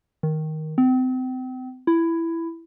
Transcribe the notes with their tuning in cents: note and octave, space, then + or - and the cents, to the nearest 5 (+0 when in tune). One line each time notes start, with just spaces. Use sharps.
D#3 +5
C4 -35
E4 +10